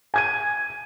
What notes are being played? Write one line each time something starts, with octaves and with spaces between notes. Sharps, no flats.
G#5 G#6 D#7